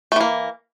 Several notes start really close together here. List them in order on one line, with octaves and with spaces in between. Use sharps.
A3 E3 A#3